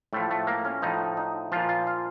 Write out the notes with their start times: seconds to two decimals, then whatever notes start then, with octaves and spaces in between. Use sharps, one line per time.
0.13 A2 F3 A3
0.31 A3
0.47 A#3
0.65 C#4
0.82 A2 F3 D#4
1.17 D#4
1.52 A#2 F3 F4
1.69 F4
1.87 F4